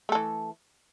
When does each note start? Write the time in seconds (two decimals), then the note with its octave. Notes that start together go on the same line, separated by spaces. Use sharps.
0.09 A3
0.12 A4
0.15 E3